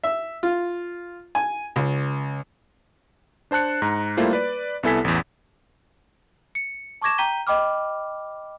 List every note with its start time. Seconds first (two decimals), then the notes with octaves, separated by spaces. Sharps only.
0.04 E5
0.43 F4
1.35 G#5
1.76 C#2
3.51 D4 C5 A5 F#6 C#7
3.82 G#2 A#5
4.17 G3 A3 A#3 E4 F4 C5
4.33 B4 D5
4.83 C2 B3 E4 A4 G#5 B6
5.04 A1 E2
6.55 C#7
7.01 A5 C#6 D6 G#6 A#6 E7
7.18 G5 A#5 G6 B6 D#7 G7
7.47 D#5 G5 B5 D6 F6